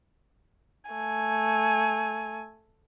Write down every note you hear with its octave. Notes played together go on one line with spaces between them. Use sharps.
A3 G#5